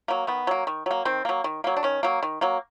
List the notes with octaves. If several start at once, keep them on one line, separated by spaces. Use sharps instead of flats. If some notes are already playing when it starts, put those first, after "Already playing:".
F#3 A#3
D#3 B3
F#3 A#3
D#3
F#3 A#3
D#3 C4
F#3 A#3
D#3
F#3 A#3
D4
D#3 C#4
F#3 A#3
D#3
F#3 A#3